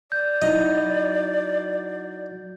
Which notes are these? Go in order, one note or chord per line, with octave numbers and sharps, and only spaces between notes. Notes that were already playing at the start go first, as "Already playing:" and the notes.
D5 G6
F#3 D#4 E4 D#5